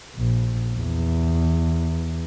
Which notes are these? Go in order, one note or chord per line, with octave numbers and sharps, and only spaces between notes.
A#1
E2